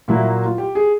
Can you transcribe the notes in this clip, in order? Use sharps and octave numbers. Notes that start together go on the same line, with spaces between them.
A#2 F#3 A#3 E4
F4
G4
G#4